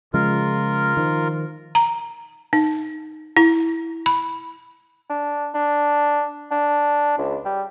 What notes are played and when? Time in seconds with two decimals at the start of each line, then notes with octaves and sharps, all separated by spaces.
0.14 C#3 F3 G#3 F4 A#4
0.97 D#3 F3
1.75 A#5
2.53 D#4
3.37 E4
4.06 B5
5.10 D4
5.54 D4
6.51 D4
7.18 C#2
7.45 G3